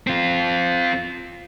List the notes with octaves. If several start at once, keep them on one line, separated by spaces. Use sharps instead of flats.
C4 F4